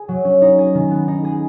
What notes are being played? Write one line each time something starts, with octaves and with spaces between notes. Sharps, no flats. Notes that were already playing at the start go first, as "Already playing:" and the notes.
Already playing: G#4
F#3
C#4
D#4
G#4
D#3
B3
D#4
G#4